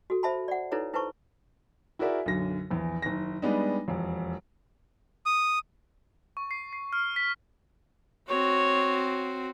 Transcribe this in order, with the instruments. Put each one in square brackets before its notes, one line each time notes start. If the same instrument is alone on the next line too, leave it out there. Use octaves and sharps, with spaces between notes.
[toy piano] F#4 A4
C5 E5 A5 B5
D5 F#5
D#4 E4 A4 B4 C#5
E4 B4 C5 A5 C#6
[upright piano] E4 F#4 G#4 A#4 D5 E5
B1 F#2 D3 A#6
A#1 E2
F#1 D#3 A#6
G3 G#3 B3 D4 D#4
E1 F2
[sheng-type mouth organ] D#6
[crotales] C#6
C7
C7
F6
B6
[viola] C4 F#4 [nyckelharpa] C#5